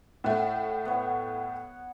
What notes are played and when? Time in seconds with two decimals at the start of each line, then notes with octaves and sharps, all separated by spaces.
0.24 A2 A3 F#5
0.85 B3 C#5